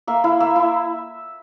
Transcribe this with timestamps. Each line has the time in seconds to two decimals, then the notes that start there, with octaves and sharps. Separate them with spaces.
0.07 A#3 E5
0.24 E4 F5
0.40 A#3 E5
0.56 E4